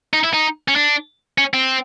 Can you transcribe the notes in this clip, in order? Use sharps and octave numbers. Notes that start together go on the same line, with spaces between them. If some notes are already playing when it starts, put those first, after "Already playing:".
D#4
E4
D#4
C#4
D4
C#4
C4